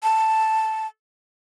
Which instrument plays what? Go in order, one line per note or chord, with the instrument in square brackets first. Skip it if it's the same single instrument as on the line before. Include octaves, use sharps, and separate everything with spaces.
[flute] A5